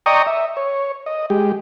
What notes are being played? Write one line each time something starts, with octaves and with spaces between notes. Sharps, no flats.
D5 D#5 G5 A#5 C#6 D#6
E5
C#5
D#5
G#3 G4